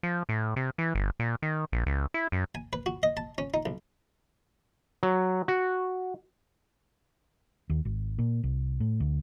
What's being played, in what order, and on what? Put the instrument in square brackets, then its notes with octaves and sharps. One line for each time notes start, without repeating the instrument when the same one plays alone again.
[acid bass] F3
A2
C3
E3
G1
A#2
D#3
A#1
C#2
E4
F#2
[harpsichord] G#5
B4
F#4
D#5
A5
C#4
D#4
B1
[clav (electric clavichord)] F#3
F#4
[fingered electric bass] D#2
G#1
A#2
C2
A2
D2